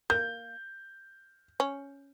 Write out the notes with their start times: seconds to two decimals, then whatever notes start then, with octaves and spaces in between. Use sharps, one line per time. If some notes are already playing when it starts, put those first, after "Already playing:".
0.10 A#3 G6
1.60 C#4